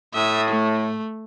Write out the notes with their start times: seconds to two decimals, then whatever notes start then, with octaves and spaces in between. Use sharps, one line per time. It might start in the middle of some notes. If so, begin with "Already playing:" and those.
0.14 A2 E5 D#6
0.50 A3